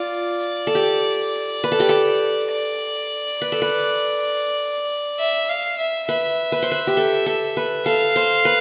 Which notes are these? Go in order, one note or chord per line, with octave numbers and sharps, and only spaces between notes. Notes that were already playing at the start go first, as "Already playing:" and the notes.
Already playing: F4 D5
A4
G4
B4
A4
G4
A4
D5
B4
A4
B4
E5
F5
E5
B4 E5
B4
C5
B4
G4
A4
A4
B4
A4 F5
C5
B4